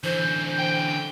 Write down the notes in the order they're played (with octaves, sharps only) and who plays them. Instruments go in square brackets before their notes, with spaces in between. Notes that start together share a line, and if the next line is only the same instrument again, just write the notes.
[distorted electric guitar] D3 E3 [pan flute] C5
[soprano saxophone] G5